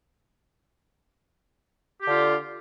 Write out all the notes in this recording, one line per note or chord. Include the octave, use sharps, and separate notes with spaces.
D3 F4 G4